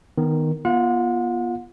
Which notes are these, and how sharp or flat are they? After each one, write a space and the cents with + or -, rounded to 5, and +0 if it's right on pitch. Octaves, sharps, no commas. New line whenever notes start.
D#3 +0 B3 +0
B3 -35 F4 -10 F#5 -40